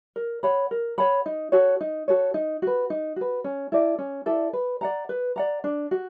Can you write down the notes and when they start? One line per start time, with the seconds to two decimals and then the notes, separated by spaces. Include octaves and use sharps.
0.16 A#4
0.43 C#5 F#5 B5
0.71 A#4
0.98 C#5 F#5 B5
1.26 D#4
1.52 F#4 A4 C#5
1.81 D#4
2.08 F#4 A4 C#5
2.34 D#4
2.62 F#4 B4
2.90 D#4
3.16 F#4 B4
3.44 C#4
3.72 E4 A4 D5
3.98 C#4
4.26 E4 A4 D5
4.53 B4
4.81 D5 F#5 A#5
5.09 B4
5.36 D5 F#5 A#5
5.64 D4
5.91 F#4